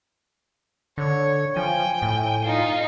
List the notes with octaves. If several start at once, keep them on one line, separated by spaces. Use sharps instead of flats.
D3 C#5
F3 G5 G#5
A2
D#4 F4